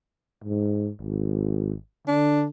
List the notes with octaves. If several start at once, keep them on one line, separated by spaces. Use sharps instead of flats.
G#2
G#1
D3 D4